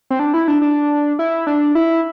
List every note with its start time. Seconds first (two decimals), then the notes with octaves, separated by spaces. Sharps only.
0.11 C4
0.19 D4
0.34 E4
0.48 D4
0.62 D4
1.19 E4
1.47 D4
1.75 E4